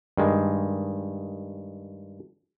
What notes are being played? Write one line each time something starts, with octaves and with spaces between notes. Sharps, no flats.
G2 D#3 G#3